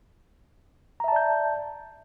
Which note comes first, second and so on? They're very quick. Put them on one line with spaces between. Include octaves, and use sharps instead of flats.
A#5 E5 A5 D5 G6